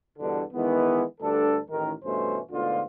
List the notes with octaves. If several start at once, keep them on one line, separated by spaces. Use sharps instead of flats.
E2 G2 B2 D3
D#3 E3 G#3 B3
D2 G2 D4 A4
A1 D#3 A#4
G2 B2 E3 A3 C#4 C5
D2 G#2 B2 D3 F4